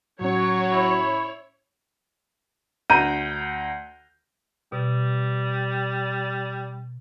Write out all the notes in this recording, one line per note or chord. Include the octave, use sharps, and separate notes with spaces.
A2 F#3 C#4 C#5
E4
D2 A#5 G6 D#7
B2 G3